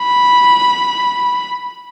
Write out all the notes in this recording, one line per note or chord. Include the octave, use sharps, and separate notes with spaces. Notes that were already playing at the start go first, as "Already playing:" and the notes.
Already playing: B5